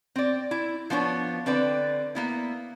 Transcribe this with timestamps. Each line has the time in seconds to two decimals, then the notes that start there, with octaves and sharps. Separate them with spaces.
0.16 C4 D5
0.51 E4
0.90 F3 B3 D4 C#5
1.46 D3 C4 B4 D5
2.15 A#3 B3 E4